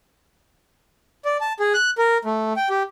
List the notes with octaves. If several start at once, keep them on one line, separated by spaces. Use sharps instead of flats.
D5
A5
G#4
F#6
A#4
A3
G5
G4